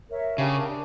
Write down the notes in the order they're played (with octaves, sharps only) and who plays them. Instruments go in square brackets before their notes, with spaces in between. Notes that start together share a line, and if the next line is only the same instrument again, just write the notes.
[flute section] A#4 C#5 E5
[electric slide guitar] C#3 [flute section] D4 G4 A#4
[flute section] D4